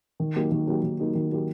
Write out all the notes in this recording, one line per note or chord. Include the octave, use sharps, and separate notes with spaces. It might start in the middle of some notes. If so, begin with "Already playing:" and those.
D#3
F#3 A#3 D#4 G4
D#3
F#3 A#3 D#4 G4
D#3
F#3 A#3 D#4 G4
D#3
F#3 A#3 D#4 G4